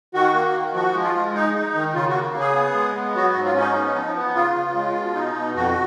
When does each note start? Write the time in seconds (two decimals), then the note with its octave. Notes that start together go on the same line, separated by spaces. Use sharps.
0.14 D#3 F#4
0.34 A#3
0.54 D#3
0.74 F3 F#4
0.94 G#3
1.04 F4
1.14 G#3
1.35 D#4
1.54 D#4
1.75 D#3
1.94 C#3 F4
2.09 F#4
2.14 A#3
2.35 C#3
2.40 G#4
2.55 B3
2.75 G#3
2.95 B3
3.15 F#3 F#4
3.30 G#2 F#4
3.45 F4
3.54 C#4
3.60 D#4
3.74 B3
3.95 F3
4.15 B3
4.35 C#3 F4
4.55 C#3
4.75 G#3
4.95 B2
5.15 D#4
5.35 B2
5.56 F2 F#4